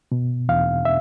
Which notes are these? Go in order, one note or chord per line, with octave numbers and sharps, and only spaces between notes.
B2
E2 F5
E5